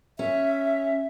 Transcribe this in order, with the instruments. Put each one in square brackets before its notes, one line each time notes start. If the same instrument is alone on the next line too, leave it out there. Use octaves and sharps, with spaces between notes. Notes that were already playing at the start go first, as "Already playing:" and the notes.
[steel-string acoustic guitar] C#4 [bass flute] E5